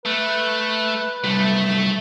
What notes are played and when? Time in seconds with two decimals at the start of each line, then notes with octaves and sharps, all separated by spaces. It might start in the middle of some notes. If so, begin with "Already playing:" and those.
0.05 A3 B4
1.24 C3 F#3 G3 A3